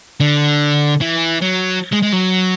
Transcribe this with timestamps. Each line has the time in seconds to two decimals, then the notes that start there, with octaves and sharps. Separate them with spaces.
0.20 D3
1.01 E3
1.42 F#3
1.92 G#3
2.03 G#3
2.13 F#3